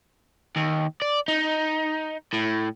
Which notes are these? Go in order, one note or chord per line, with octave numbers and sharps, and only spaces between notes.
D#2
D5
D#4
A2